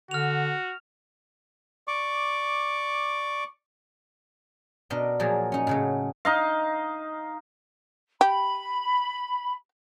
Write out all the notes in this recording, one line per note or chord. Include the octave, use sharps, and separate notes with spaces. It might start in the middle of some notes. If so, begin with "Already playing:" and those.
D3 F#4 F6 F7
D5 C#6 D6
B2 D4 A#4 D#5
A#2 F3 F#3 A#3 G#4
C#4 D#4
A2 C#3 F#3
D#4 D#5 F5
G4 B5